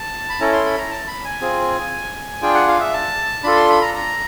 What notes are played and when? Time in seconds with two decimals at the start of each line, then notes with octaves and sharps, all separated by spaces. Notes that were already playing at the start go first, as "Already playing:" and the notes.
Already playing: A5
0.29 B5
0.40 C#4 E4 A4 A#5
0.52 C6
0.65 B5
0.78 A#5
0.91 A5
1.07 B5
1.25 G#5
1.41 C4 F4 G#4
2.42 D4 F4 G#4 G5
2.55 F#5
2.68 F5
2.80 E5
2.93 A5
3.43 D4 F4 A4 B5
3.56 C6
3.69 B5
3.82 A#5
3.94 A#5